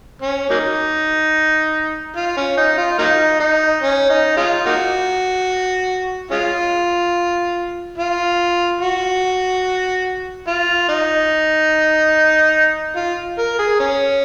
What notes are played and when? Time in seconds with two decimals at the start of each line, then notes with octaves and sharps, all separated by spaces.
0.22 C#4
0.50 F#3 A#3 D#4
2.16 F4
2.37 C#4
2.57 D#4
2.78 F4
2.99 F#3 A#3 D#4
3.40 D#4
3.83 C#4
4.10 D#4
4.37 G#3 C#4 F4
4.66 A#3 D#4 F#4
6.31 G#3 C#4 F4
7.97 F4
8.81 F#4
10.47 F4
10.89 D#4
12.96 F4
13.38 A#4
13.59 G#4
13.80 C#4